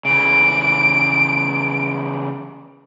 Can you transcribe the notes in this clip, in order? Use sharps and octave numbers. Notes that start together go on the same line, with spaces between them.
C#3 E3 D7